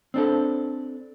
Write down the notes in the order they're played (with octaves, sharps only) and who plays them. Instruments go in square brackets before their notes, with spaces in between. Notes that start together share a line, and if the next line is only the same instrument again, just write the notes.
[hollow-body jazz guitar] C4 D4 A4